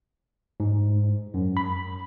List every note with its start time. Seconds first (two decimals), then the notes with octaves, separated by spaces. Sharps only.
0.60 G#2
1.34 F#2
1.57 B5